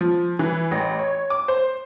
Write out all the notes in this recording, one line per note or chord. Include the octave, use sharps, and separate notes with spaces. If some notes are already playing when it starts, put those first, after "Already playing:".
F3
E3
A1
C#5
D6
C5